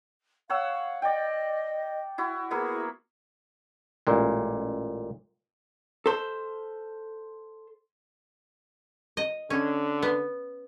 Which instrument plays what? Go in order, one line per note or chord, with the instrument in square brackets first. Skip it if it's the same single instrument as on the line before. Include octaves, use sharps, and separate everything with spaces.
[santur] C#5 F#5 E6 [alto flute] F5
[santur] D5 G5 [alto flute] D#5
[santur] E4 F#4
[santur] A#3 B3 E4 [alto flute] G#4
[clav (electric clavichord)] A1 A#2 G#3
[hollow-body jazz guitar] A4 C5
[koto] D#5
[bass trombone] D3 [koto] C#4
[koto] B3